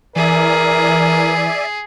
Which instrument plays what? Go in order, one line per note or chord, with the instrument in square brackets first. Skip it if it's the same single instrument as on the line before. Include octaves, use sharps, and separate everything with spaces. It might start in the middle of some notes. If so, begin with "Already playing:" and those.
[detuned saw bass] E3 [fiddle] G#4 [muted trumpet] A#4 [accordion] D5 E5 G#5